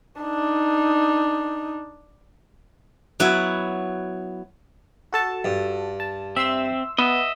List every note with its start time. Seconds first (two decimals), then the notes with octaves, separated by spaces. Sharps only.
0.21 D4 D#4
3.20 F#3 B3 E4 F#4
5.13 F#4 A4 A5
5.45 G2
6.00 A5
6.36 C4 E5 C6 E6
6.98 B3 D#5 E5